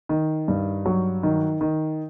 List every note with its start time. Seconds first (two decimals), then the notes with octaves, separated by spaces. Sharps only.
0.09 D#3
0.48 G2
0.86 F#3
1.23 D#3
1.61 D#3